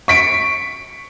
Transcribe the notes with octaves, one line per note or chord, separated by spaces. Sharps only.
C#6 B6 D7